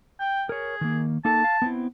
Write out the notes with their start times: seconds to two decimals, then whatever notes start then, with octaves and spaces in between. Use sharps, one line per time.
0.20 G5
0.49 G#4 A#4 C#5
0.81 D#3 A#3
1.25 A#3 D#4 A4 A5
1.44 F5
1.62 B3 C4 E4